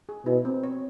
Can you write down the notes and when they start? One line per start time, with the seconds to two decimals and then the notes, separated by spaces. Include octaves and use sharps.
0.09 G#4
0.26 B2 E4
0.45 C4
0.63 C#5